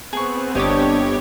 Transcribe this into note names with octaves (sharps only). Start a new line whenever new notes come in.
B3 C4 G#4 C#6
G1 D4 G4 C#5 D#5 D6